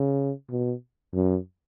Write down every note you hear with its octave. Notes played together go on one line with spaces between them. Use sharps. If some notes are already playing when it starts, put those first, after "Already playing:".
Already playing: C#3
B2
F#2